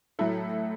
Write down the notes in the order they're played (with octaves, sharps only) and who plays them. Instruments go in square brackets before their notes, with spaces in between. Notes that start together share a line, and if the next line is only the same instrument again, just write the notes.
[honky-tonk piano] A2 F#3 A3 E4 A4